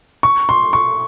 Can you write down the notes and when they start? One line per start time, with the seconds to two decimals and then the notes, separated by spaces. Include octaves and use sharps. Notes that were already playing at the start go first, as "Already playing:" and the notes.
0.23 C#6
0.49 C6
0.73 C#6